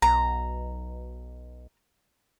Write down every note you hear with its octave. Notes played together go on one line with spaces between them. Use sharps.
B1 A#5